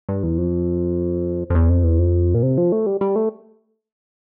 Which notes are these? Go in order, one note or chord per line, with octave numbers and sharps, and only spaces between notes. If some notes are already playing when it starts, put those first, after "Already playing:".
G2
E2
F2
F2
E2
F2
E2
F2
A#2
C3
F3
A3
G3
G3
A3